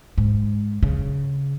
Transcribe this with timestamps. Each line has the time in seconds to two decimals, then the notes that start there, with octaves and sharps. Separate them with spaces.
0.18 G#2
0.83 C#3